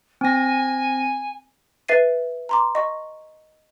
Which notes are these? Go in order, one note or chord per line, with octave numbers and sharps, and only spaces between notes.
C4 G#5 A#6
B4 E5 A6 C7 D#7
A#5 C6 D6
D#5 C#6